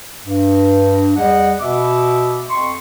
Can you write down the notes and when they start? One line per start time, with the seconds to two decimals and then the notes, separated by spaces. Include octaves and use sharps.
0.24 G2
1.17 E2 G3 D#5 F#5
1.60 B2 B3 E5 D6
2.49 F2 C6 C#6